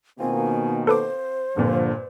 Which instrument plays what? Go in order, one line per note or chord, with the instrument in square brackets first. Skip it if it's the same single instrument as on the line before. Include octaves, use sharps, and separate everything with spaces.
[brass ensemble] B2 D#3 A#3 [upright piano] C4 F4 [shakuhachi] G#5
[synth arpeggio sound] A4 B4 D6 [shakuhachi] C5
[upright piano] G2 A#2 [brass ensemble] D3 F3